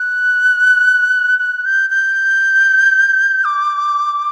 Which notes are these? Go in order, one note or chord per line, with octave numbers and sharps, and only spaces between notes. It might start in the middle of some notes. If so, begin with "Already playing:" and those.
Already playing: F#6
F#6
G6
G6
D6